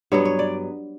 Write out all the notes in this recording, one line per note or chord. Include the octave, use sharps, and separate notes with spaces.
G2 F#3 B3 C#5
C#5
D5